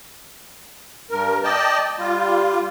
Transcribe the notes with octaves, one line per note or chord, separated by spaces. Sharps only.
G2 A#4
D5 D#5 G5 A5
G3 F4